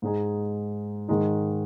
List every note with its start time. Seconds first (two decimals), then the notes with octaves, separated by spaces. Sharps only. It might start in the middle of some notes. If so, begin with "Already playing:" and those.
0.02 G#2 G#3 D#4 G#4
1.08 G#2 D#3 G#3 D#4